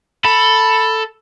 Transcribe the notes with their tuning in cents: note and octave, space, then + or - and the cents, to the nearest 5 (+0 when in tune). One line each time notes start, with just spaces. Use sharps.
A4 +10 B5 +0